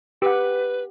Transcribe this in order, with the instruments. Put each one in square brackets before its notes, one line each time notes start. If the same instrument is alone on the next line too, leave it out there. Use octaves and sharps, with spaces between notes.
[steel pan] G4 F#5 [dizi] B4